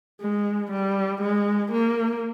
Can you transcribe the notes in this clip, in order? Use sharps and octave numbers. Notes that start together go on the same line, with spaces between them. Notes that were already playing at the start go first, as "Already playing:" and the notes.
G#3
G3
G#3
A#3